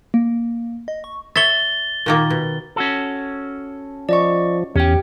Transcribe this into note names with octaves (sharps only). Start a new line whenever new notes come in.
A#3
D#5
C#6
C#5 E5 A6 G7
A#2 D#3 A#3
B2
C#4 F#4 A4
F3 D5 D#5 C#6
E2 C#4 G4 G5